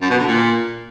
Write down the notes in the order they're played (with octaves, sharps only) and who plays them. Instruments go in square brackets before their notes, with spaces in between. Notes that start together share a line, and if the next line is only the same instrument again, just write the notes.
[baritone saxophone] F#2
B2
D3
A#2